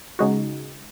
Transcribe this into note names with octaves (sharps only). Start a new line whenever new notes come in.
C#3 G#3 D#4 F#4